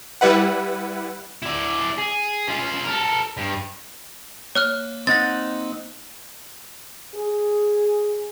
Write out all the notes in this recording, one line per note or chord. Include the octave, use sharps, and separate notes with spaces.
G3 E4 B4 F#5
E4 D5
G#4
C#4 F4
A4 A#4
G2
A#3 C#5 F6 F#6
C4 D#4 F#5 A6 A#6
G#4